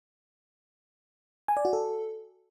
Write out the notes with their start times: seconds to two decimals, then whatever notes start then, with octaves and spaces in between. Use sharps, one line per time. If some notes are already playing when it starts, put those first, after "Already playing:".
1.48 G#5
1.57 D5
1.65 F#4
1.73 A4